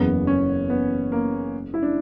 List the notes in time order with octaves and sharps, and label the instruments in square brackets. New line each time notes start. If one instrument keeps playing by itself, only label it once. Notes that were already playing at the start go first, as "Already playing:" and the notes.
Already playing: [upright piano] F#1 E2 C#3 [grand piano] B3
[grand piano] C#4
B3
A#3
E4
D4